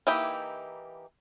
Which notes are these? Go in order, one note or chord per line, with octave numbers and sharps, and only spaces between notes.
E3 A#3 D#4 E4 G4